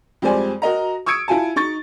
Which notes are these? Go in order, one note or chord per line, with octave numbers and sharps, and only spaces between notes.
F2 G3 G#3 C5 D5 G#5
F#4 A#4 D#5 A#5
C#6 D#6 E6 G#6 C#7 D7
E4 F4 G#5 A5
D#4 C#6 A6